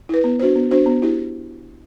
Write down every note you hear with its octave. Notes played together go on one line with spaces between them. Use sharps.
E4 B4
B3
D4 F#4 C5
B3
D4 F#4 C5
B3
E4 G4